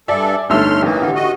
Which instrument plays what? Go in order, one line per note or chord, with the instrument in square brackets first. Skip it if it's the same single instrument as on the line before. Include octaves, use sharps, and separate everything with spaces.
[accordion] G2 A4 [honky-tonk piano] D5 E5 [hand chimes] G#5
[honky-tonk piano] G1 A3 E6 [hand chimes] D4 D#4 C#5 [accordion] C6 F6
[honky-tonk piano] A1 [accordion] E3 A#3
[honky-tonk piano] D3 [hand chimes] G4 F#5
[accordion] F#4 D#5